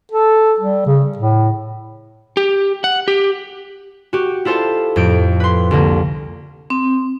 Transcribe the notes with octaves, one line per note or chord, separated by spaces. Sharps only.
A4
G3
C#3
A2
G4
F#5
G4
F#4 G4
E4 F4 A4 C5 A5
F2 A2 G6 D7
B4 C6
C2 D3 A#3
C4